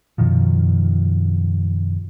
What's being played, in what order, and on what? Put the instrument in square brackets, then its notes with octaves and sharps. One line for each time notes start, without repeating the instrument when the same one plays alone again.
[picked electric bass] F#2 B2 D#3 F3